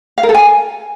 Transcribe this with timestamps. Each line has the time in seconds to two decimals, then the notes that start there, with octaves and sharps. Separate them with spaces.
0.18 F5
0.23 A#4
0.29 A4
0.35 G#5